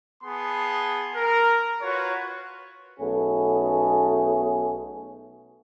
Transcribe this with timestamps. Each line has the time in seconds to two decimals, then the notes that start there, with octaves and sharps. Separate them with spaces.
0.24 B3 G#4 A5 C6
1.15 A#4
1.82 F4 F#4 B4 C#5
3.00 B1 A3 B3 C#4 G#4